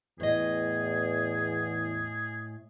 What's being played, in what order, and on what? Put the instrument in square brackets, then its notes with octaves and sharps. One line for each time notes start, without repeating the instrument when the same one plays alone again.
[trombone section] E2 [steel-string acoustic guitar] A2 D#5 [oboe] G#4